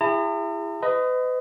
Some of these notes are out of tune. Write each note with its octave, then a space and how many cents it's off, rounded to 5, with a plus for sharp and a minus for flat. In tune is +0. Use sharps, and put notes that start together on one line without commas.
E4 +20 G#4 -40 A#5 -45
B4 +40 D#5 +0